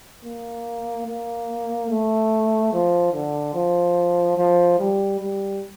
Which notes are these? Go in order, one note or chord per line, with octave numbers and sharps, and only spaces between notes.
A#3
A#3
A3
F3
D3
F3
F3
G3
G3